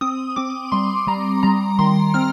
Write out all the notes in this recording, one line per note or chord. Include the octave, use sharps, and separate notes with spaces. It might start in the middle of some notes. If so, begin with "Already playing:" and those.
C4 D#6
C4 D6
G3 C6
G3 A#5
G3 A#5
D#3 C6
C4 F6